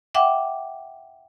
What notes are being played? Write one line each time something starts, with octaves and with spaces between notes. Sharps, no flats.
E5 F#5 G5 D6